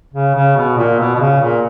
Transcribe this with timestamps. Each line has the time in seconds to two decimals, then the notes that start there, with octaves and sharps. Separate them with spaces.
0.14 C#3
0.35 C#3
0.57 B2
0.77 A#2
0.99 B2
1.15 B2
1.20 C#3
1.41 A#2